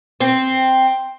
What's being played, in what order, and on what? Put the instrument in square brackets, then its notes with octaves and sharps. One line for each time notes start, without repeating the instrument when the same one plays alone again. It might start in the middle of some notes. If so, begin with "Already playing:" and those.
[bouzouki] C4